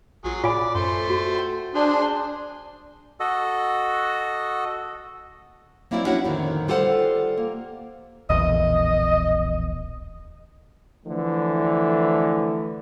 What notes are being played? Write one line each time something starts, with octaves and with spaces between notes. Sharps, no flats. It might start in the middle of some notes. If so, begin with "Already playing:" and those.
A1 F#3 F4 G#4
A2 F4 C#5 D5 G#5 B5
F#2 A3 C5
F#4
F#5 G5
D4 G#4 C5
F#4 A4 D#5
F#3 A#3 C4 E4 F#4 D5
C#4 D4 E4 F#4 C#5 F#5
F2 A2 D3 D#3 A#3
G3 F4 A4 C5 F#5
A#3
D1 A#1 E2 D#5
D3 E3 F3 A3